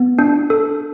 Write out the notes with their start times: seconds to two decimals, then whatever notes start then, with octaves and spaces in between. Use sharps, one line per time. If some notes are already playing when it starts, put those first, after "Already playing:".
Already playing: B3
0.19 D4
0.50 A4